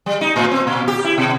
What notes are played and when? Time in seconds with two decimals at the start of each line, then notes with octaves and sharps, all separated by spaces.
0.06 G3
0.21 D#4
0.36 A2
0.51 C4
0.67 A#2
0.88 G4
1.05 E4
1.18 B2